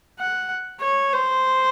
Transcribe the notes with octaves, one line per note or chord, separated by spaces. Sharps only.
F#5
C#5
C5